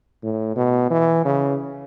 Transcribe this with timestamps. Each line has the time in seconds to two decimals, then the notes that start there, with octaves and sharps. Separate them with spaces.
0.23 A2
0.56 B2
0.90 E3
1.25 C#3